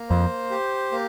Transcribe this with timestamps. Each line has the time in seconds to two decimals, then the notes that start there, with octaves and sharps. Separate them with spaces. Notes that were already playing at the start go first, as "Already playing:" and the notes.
Already playing: A#3
0.09 F2 C5
0.51 G4
0.92 A#3